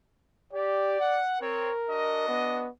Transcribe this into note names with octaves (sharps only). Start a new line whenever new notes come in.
G4 D5
F#5
C4 A#4 C#5
D4 F#4 D#5
B3